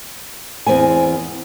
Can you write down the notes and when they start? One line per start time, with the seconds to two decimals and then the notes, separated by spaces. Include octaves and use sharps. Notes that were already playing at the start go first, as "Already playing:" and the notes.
0.67 E2 C4 B4 G#5